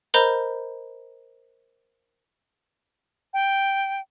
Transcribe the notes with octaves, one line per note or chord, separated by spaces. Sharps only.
A#4 C5 D#5 A#5 B5 G6
G5